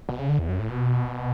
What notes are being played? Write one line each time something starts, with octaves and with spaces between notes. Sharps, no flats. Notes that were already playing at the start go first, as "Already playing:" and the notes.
B2
C#3
D3
E2
F#2
A2
B2